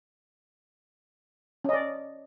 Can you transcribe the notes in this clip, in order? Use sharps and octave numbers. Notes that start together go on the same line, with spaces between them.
C#4 D5 D#5